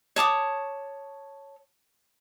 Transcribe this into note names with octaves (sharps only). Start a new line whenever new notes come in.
C#5 A5 D6 D#6